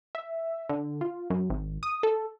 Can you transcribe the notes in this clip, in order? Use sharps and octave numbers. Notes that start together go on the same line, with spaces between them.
E5
D3
F4
F#2
G#1
D#6
A4